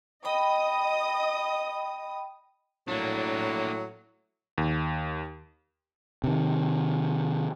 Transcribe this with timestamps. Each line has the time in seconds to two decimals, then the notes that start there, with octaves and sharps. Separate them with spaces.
0.25 D#5 G5 B5 D#6
2.88 A2 F#3 A#3 D4
4.58 D#2
6.24 C3 D#3